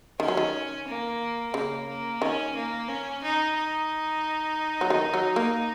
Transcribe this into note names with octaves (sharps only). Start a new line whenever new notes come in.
D#3 C#4
F#3
D#3
A#3
C#3 A#3
A#3
D#3 C#4
A#3
C#4
D#4
D#4
F#3
D#3
F#3
A#3